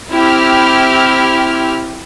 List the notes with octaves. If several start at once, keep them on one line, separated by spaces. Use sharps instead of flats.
C4 E4 G4 F6